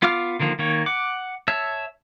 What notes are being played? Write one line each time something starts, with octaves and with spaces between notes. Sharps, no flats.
B3 F4 F5 D6 F6
D3 D#3 F3 A#3
D#3 A#3 C#5
F#5 D6
C#5 E5 A5 E6